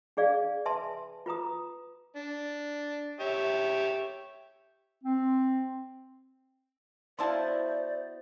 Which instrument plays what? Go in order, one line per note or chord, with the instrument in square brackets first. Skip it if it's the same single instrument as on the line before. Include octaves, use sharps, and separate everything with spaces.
[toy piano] D4 G#4 D5 F5
B4 E5 G#5 A5 C6
F4 B4 A#5 D#6
[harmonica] D4
G4 C#5 E5
[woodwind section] C4
[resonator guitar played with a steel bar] B3 E4 F#4 [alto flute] C5 [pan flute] D5 [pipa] F5 A5 C6